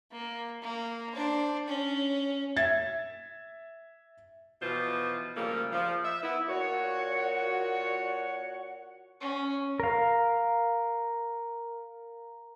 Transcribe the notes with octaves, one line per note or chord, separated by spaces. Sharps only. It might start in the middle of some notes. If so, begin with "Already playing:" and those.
A#3
A#3
D4 C5
C#4
E5 G#6 A6
B2 E3 F3 F4 C5
C#3 F3 G3 A3 A#3
F3
E5
B3 E4
A#2 F#4 C#5 F#5
C#4
A#4 F5